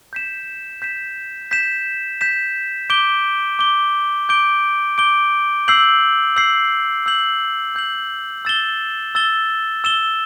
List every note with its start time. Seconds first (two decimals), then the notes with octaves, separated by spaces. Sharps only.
0.13 G6 B6 E7
0.82 G6 B6 E7
1.51 G6 B6 E7
2.21 G6 B6 E7
2.90 D6 G6 D7 G7
3.59 D6 G6 D7 G7
4.29 D6 G6 D7 G7
4.98 D6 G6 D7 G7
5.68 E6 G6 C7 F#7
6.36 E6 G6 C7 F#7
7.06 E6 G6 C7 F#7
7.75 E6 G6 C7 F#7
8.45 E6 A6 E7 G7
9.15 E6 A6 E7 G7
9.84 E6 A6 E7 G7